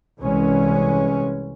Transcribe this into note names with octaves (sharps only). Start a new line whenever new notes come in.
C2 E3 G#3 C#4